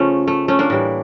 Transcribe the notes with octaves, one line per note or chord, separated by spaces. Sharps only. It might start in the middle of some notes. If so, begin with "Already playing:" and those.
Already playing: C#3 F3 A3 C#4
A3
A3 C#4
A#3 D4
A2 E3 G3